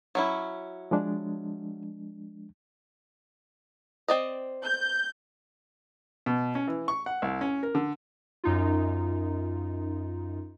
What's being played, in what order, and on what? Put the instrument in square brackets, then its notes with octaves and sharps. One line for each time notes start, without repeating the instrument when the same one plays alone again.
[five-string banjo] F#3 C#4 E4
[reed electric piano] F3 G#3 D4
[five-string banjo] C4 D5 D#5
[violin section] G6
[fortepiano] B2
C#4
E3
C#6
F#5
C2
C#4
A#4
D3
[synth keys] F#2 D#4 F4